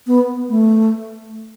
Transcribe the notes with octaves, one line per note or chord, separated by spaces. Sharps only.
B3
A3